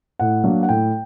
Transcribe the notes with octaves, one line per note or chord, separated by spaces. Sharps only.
A2 F#5
F#3 A#3 D4
F#5
A2 G5